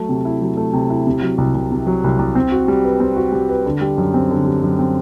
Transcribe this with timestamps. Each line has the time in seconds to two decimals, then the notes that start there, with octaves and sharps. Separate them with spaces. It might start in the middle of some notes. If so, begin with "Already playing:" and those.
Already playing: F#3 A3
0.09 C3
0.25 E4
0.42 F#3
0.57 A3
0.73 C3
0.90 E4
1.07 C3
1.22 F#3
1.38 C2
1.55 C2
1.71 C3
1.87 F#3
2.04 C2
2.19 C2
2.35 C4
2.52 F#4
2.68 G3
2.84 B4
3.00 C4
3.16 F#4
3.32 G3
3.49 B4
3.65 D3
3.81 G3
3.98 F#2
4.14 C4
4.31 D3
4.46 G3
4.62 F#2
4.79 C4